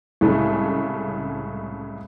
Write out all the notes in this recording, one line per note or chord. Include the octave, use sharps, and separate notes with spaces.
C2 A2 C#3 G#3 A3